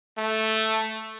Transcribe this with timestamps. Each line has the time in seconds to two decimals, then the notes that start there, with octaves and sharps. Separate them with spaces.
0.17 A3